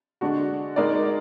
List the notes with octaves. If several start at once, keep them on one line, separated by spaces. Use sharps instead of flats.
D3 G#3 D4 F#4
G#3 D#4 A#4 D5